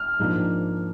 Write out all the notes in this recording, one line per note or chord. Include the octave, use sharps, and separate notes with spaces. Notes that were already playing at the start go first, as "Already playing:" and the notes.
Already playing: F6
G#2 F3 A#3 D4